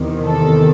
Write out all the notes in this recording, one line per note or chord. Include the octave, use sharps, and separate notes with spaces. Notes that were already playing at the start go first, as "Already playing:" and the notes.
Already playing: E2 C3 D#3
A4